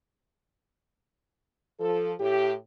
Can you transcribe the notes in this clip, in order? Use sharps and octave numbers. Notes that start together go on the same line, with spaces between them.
F3 A4
A2 G4